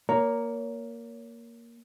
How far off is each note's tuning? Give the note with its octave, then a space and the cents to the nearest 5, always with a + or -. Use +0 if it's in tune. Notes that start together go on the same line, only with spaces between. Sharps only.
A#3 +0 C#5 +25 A#5 +0